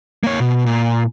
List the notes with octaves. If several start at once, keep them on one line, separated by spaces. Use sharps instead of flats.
A#3 C#5
B2
A#2